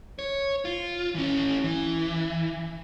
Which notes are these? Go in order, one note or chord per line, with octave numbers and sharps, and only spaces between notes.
C#5
F4
E3 C#4
E3